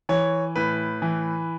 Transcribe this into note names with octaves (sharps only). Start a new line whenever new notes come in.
E3 C#5
A2 B4
E3